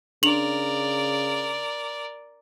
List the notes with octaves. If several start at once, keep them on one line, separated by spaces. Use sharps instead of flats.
C#3 D4 A#4 D5 F7 F#7